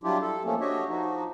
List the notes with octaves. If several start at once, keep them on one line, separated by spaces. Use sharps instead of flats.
F#3 G3 D4 E4 F4 G4
A4
F3 A3 A#3 C#4
D4 F#4 G4 C#5 D#5 E5
F3 D#4 F#4